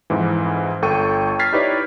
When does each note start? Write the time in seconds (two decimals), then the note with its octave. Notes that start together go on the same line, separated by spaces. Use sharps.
0.10 F2 G#2 E3
0.82 G1 A4 G5 C#6 D#7
1.39 F6 G#6 A6 B6 C7
1.52 D#4 E4 G4 B4 C#5 D5